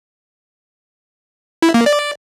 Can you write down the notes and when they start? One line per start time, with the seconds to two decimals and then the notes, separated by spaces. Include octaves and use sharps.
1.62 E4
1.74 A#3
1.86 D5